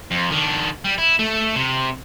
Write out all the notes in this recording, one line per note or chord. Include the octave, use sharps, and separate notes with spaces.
F2
D#3 D4
G3
E4
A3
C3